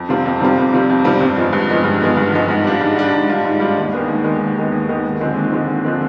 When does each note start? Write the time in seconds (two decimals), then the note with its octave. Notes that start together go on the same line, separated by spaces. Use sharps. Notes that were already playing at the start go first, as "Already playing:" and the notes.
Already playing: F2
0.09 C3 G3 C4 F4
0.26 F2
0.41 C3 G3 C4 F4
0.57 F2
0.73 C3 G3 C4 F4
0.90 F2
1.04 C3 G3 C4 F4
1.21 G2
1.37 F3 G#3 B3
1.53 G2
1.69 F3 G#3 B3
1.84 G2
2.01 F3 G#3 B3
2.17 G2
2.33 F3 G#3 B3
2.49 G#2
2.64 G3 D4 F4
2.81 G#2
2.97 G3 D4 F4
3.13 G#2
3.28 G3 D4 F4
3.45 G#2
3.60 G3 D4 F4
3.77 D#2
3.93 D#3 G#3 B3
4.08 D#2
4.24 D#3 G#3 B3
4.41 D#2
4.57 D#3 G#3 B3
4.72 D#2
4.89 D#3 G#3 B3
5.04 D#2
5.20 D3 F3 G#3 C4
5.36 D#2
5.52 D3 F3 G#3 C4
5.68 D#2
5.84 D3 F3 G#3 C4